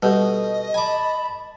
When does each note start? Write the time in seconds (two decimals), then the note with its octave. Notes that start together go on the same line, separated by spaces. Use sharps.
0.03 B2 G3 G4 A4 D#5
0.74 G#5 A5 B5 D6